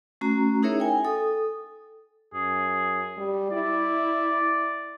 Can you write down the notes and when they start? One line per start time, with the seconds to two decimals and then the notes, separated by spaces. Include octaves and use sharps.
0.21 A3 C#4 F#4 A#5
0.63 D#4 E4 G#4 A#4 C#5 E5
0.80 G5 G#5
1.05 A4 D#6
2.34 F#2 G#4
3.18 G3
3.51 E4 D5